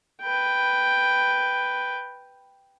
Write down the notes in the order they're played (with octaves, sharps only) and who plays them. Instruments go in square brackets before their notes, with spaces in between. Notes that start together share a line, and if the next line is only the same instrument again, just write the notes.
[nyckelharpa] B4 G5